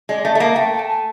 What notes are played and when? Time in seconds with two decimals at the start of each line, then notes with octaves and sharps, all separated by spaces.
0.09 G#3 D5
0.24 A3 D#5
0.35 A3
0.40 A#3 E5
0.56 A3 G5
0.79 A5
0.88 G#5